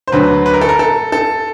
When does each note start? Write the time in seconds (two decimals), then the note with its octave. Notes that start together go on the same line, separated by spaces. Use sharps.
0.08 C5
0.12 D2 D3 F#3 B4
0.46 B4
0.53 A#4
0.61 A4
0.69 A#4
0.79 A4
1.12 A4